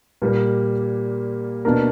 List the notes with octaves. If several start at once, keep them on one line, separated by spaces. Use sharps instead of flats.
A#2 G3 A#3
B2 A#3 D4 A#4